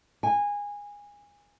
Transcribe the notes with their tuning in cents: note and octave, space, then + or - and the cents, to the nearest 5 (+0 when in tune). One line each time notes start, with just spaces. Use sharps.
G#5 -20